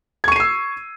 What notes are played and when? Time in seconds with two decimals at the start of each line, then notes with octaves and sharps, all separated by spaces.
0.24 G#6
0.28 C#6
0.32 D#7
0.36 C7
0.40 E6